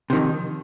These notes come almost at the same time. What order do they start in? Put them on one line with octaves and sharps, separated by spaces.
C3 D#3 F2